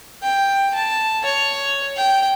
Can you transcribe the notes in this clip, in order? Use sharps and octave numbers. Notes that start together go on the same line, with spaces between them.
G5
A5
C#5
G5